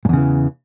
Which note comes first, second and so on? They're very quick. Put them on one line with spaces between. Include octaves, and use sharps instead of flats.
G#2 E2 C#3 E3